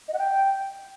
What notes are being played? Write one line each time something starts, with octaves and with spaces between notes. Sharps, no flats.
D#5
F#5
G5